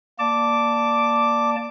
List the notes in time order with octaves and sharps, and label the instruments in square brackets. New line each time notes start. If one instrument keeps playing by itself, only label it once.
[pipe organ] A#3 D5 A5 [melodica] D6